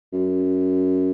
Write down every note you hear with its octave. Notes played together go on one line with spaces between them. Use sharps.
F#2